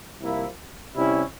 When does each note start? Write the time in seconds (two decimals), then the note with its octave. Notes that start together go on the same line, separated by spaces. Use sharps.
0.20 C2 C3 F3 A#3 E4
0.96 C3 G3 C#4 E4